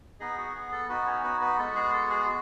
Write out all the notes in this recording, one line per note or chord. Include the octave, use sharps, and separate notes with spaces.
B3 D#4 G#4 D#5
F#4 F#5
G#4
A4
B3 D#4 F#4 B4
C#4 C#5
B3 B4
B3 B4
G#3 B3 F#4 A4
G#4
A4
G#4
F#4